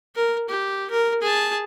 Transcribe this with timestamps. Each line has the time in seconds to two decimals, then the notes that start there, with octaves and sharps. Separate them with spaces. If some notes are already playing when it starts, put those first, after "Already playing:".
0.15 A#4
0.49 G4
0.90 A#4
1.22 G#4 A5